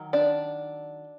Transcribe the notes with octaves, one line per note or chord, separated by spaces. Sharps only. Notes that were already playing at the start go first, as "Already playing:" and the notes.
Already playing: D#3 F#3
D4 D5